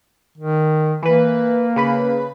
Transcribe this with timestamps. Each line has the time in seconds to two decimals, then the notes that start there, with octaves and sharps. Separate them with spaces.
0.38 D#3
1.03 E3 A#3 B4
1.76 C#3 B4 B5